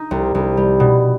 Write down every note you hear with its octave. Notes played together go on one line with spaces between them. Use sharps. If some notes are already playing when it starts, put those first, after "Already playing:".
Already playing: D#4
C2
C2
G3
B2